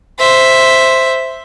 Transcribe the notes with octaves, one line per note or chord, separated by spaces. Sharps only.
C5 E5